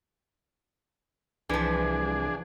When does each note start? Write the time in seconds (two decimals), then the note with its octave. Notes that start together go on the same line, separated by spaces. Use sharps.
1.50 C2 E3 F3 D4 G#4